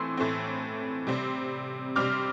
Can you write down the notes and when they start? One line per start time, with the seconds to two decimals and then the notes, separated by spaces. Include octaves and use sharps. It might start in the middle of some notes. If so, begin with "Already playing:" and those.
Already playing: A2 E3 A3 C4 C6 E6
0.17 A2 E3 A3 C4
1.07 C3 G3 C4
1.96 C3 G3 C4 D6 F6